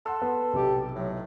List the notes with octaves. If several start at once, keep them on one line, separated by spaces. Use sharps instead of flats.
A4 F#5 C6 E6
B3
B1 C3 G4
A2 F#3